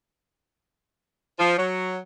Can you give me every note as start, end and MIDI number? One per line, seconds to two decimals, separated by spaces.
1.39 1.56 53
1.57 1.98 54